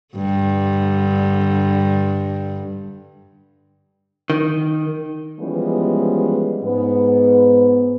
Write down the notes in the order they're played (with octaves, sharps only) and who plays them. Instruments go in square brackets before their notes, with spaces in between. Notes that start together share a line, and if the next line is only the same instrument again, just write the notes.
[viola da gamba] G2 D3
[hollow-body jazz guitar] D#3
[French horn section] E3 F3 G3 G#3 B3 C#4
G#2 B3